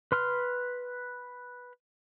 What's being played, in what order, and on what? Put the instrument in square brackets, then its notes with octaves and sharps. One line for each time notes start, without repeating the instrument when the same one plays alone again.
[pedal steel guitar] B4 C6 F6